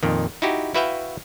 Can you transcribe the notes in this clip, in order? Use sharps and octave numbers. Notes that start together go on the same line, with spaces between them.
F2 A#2 D#3
D#4 E4 F#4 G4
E4 F#4 B4 E5 F5 G5